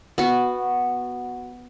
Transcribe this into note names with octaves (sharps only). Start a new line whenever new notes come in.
B3 F#4